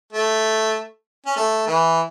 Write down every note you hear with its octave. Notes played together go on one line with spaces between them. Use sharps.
A3
C#4
A3
E3